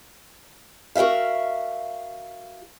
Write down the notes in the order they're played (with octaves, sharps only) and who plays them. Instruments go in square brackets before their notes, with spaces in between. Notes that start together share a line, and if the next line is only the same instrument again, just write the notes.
[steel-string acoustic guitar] F#4 A#4 B4 E5 F5